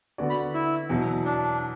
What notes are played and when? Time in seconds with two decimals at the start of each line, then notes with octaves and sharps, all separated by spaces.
0.18 D3 B3 F#4 D5
0.30 B5
0.54 E4
0.89 E2 B2 F#3
1.25 D4